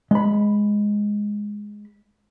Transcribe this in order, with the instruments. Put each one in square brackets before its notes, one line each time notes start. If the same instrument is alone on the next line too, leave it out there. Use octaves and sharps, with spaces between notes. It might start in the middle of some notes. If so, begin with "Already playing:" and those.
[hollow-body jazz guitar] G#3 B5